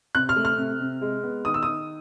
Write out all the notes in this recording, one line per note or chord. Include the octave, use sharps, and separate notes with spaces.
C3 F#6
F6
A3
F6
C3
C3
G#3
B3
D#3 D#6
E6
D#3 D#6